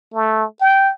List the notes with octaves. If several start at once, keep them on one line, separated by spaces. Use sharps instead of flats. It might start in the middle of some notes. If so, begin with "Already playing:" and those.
A3
G5